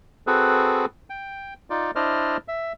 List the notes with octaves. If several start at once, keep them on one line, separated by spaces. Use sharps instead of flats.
C4 F#4 G#4 A4 B4
G5
D#4 F4 D5
D4 E4 C5 D5 D#5 F6
E5